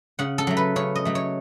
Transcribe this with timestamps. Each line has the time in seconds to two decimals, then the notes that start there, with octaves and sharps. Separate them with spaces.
0.19 C#3 F#5
0.38 A4
0.47 F#3 A3
0.57 B4
0.76 C#3 C#5
0.95 D#5
1.05 F#3 A3
1.15 C#5